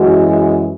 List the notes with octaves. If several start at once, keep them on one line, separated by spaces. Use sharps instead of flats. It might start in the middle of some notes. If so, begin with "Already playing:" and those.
Already playing: F#2 E3 G#3 F#4
F#4